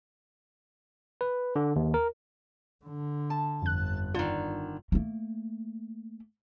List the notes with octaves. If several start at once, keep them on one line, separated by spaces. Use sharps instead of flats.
B4
D3
D#2
A#4
D3
A5
G1 F2 F#6
D3 D#3 F4
A3 A#3